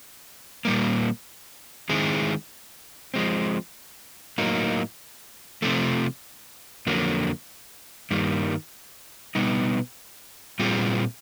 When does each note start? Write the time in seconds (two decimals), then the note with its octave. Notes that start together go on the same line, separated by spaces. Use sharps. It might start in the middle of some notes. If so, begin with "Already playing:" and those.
0.65 A#2 G3 A#3
1.89 D#3 G#3 C4 E4 G#4
3.14 F3 G#3 C4
4.38 A2 F#3 A#3 D#4
5.62 C3 F3 A3
6.87 F2 D3 F#3 A#3
8.11 G2 D#3 G3 A#3
9.35 B2 G3 B3 D#4
10.59 A#2 G3 C4 F4 G#4